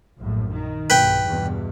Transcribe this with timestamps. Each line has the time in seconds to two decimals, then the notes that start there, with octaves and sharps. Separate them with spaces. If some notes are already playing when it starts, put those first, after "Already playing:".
0.18 A#1 F#2 A2
0.52 D#3
0.90 B1 G2 B4 G5
1.26 E2 G2 B2